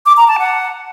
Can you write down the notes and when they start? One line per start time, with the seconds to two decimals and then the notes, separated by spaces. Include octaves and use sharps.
0.06 D6
0.17 A#5
0.28 A5
0.39 F#5